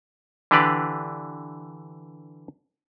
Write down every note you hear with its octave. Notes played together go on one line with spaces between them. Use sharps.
D3 E3 D4 G4 B4 D5